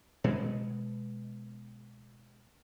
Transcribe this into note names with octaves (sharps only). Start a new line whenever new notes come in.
B2 G#3 B3